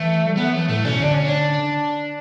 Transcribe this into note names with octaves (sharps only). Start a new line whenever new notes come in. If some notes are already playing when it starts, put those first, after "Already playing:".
Already playing: E3 A3
G3
F#3 B3
E3 A3
A2 A3
B2 C#4
D3 D4
C#4
D4